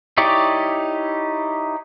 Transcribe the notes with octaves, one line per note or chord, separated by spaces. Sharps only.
D#4 E4 G4 C#5 D5